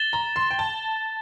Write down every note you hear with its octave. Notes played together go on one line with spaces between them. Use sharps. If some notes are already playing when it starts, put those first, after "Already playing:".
Already playing: A6 E7 G7
A#5
C6
G5
A5